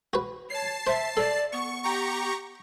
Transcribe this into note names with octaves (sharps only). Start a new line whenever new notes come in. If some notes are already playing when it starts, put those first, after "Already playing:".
F#4 B4
C#5 A5 C7
C5 E5
A4 D5
B3 C#6
G4 A#5 C#6